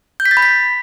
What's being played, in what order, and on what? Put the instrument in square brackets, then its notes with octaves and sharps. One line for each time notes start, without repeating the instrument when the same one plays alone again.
[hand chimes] G6
B6
A6
B5
B6